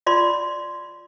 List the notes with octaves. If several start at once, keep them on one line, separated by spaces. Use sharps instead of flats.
F4 D5 C6